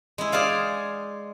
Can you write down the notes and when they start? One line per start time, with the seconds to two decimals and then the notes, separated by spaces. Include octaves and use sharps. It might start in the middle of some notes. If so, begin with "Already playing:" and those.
0.18 G#3 E4
0.32 G#4 C5 D5 F5